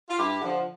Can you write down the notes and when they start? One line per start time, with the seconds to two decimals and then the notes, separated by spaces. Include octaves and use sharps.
0.10 F4
0.18 G2 E4 G4
0.41 D3 F3